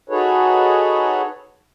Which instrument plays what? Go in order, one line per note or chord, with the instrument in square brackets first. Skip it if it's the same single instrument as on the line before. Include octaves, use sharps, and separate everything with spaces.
[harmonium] D#4 F#4 G#4 A4 B4 C#5